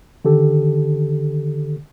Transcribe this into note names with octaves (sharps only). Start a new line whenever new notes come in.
D3 D#3 G4 A4